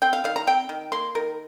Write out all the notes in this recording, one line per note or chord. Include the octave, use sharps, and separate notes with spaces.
C4 G5
F5
D#3 F5
A#5
C4 G5
D#3
A#3 C6
D#3 A#4